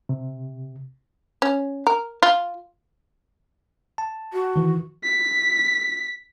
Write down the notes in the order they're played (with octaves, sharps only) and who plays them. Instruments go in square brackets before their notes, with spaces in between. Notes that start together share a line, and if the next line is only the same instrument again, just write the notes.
[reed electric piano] C3
[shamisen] C#4
A#4
F4
[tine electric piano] A5
[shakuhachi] F#4
[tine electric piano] D#3 E3
[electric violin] B6